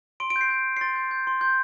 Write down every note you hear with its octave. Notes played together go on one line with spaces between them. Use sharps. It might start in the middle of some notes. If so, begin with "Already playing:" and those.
C6 D7
D7
G6
C7
G6
C6
C7
C6 A6
G6
G6
C6
C6 G6